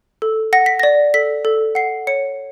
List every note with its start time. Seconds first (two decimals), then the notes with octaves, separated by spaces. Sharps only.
0.22 A4
0.53 F#5 A#6
0.66 B6
0.79 D5 A#6
1.14 A4 B6
1.45 A4
1.75 F#5 C7
2.07 C#5 C#7